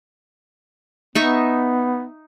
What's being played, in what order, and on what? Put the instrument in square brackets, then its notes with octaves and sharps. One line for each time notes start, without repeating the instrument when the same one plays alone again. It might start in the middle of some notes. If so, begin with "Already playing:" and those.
[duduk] B3 [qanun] D#4 E5 C#6